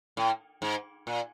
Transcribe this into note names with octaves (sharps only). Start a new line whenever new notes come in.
A2
G#2
A#2